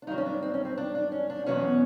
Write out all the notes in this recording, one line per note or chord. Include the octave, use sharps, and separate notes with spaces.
D4
G2 D#3 F#3 D#4
C#4
D4
C4
C#4
C4
D4
D4
C#4
D4
E2 B2 F#3 B3 C#4